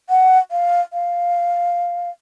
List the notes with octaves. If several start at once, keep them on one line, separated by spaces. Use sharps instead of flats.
F#5
F5
F5